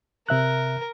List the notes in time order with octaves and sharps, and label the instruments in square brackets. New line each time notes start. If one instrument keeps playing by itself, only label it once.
[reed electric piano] C3 E5 F#6 [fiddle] A#4